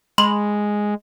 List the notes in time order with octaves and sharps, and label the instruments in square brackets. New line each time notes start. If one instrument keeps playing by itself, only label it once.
[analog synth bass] G#3 [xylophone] B5 C6 F#7